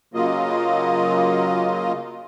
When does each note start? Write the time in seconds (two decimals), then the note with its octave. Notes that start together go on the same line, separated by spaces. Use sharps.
0.14 C#3 F#3 A#3 F4 D#5